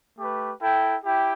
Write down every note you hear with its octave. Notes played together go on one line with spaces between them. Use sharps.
A3 G4 B4
E4 A4 G5
E4 G4 G5